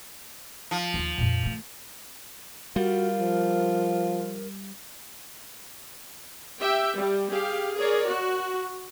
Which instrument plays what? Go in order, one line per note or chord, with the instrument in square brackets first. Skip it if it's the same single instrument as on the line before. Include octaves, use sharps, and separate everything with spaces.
[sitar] F3
[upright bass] D#2 A#3
F2 A#2
D#3 A3
[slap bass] G3 [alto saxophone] F4 [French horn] F#4 [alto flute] A#4
[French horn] F3
[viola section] G4 E5 G5
G3
G4 G#4 F5
G#4 A#4 C#5 D5
F#4